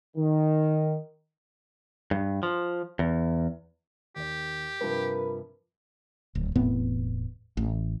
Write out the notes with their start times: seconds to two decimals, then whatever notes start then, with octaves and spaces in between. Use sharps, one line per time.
0.17 D#3
2.11 G2
2.43 F3
2.99 E2
4.16 D#2 G4 D5
4.81 G2 C3 F3 A#4 B4
6.35 D1
6.55 E1 A2 B3 C4
7.57 A1